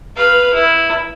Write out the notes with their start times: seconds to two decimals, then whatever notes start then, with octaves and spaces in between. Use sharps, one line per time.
0.16 B4 F5
0.54 E4